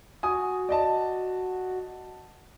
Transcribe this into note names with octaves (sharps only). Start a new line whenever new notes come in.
F#4 G#5 D#6
D5 D#5 A5